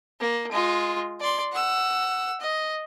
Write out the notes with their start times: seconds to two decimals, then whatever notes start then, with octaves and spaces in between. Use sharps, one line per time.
0.20 A#3
0.51 G#3 F4
1.20 D5 C6
1.52 F#5 E6
2.41 D#5